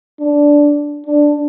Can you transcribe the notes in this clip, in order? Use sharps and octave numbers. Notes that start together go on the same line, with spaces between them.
D4
D4